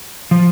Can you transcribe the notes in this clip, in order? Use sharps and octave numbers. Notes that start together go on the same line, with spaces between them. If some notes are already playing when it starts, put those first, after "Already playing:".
F3